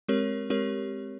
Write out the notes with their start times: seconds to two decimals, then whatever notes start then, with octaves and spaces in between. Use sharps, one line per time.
0.08 G#3 C4 G4 A#4 C#5
0.50 G#3 C4 G4 A#4 C#5